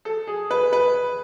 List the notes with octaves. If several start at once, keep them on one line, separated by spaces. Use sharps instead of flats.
A4
G#4
B4
B4